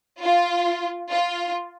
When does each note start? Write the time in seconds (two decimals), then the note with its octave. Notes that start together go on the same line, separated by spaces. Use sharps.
0.23 F4
1.11 F4